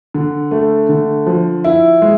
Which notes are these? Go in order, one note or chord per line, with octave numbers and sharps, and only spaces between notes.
D3
A3
D3
F3
E4
G#3